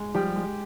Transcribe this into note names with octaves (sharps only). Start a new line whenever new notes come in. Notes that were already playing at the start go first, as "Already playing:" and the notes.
Already playing: G#3
F3 G3 G4
G#3